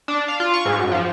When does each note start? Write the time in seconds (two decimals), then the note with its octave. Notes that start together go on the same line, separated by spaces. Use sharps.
0.08 D4
0.28 F5
0.40 F4
0.54 C#6
0.65 G#2
0.78 F#2
0.92 F3